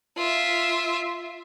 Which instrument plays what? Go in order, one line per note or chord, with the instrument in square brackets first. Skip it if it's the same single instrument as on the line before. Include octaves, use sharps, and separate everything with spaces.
[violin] F4 E5